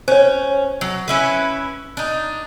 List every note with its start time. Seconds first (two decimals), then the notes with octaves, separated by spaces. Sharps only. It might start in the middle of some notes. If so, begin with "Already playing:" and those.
0.08 C#4 C5 C#5
0.81 F#3
1.08 C#4 E4 B4
1.97 D4 D#4